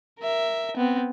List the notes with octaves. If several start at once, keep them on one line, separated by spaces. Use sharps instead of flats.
A#4 E5
B3 C4